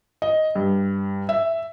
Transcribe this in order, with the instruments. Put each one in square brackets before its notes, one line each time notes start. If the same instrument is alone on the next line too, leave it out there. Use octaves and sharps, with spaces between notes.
[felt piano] D#5
G2
E5